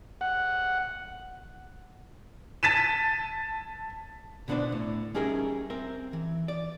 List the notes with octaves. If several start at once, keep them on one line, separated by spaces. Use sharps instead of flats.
F#5
A5 A6 B6 D#7 E7
B2 D3 B3 D4 C5 D5
A2
G3 C#4 D#4 G#4 A#4 E5
C4 A#4 E5
E3
D5